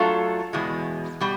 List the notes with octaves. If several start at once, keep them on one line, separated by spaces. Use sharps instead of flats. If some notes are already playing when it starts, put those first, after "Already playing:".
Already playing: F#3 A3 D4 F4 A4
E2 B2 G#3
B2 G3